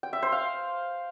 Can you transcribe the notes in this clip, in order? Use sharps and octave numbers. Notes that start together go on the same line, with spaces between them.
G5
E5
C5
F5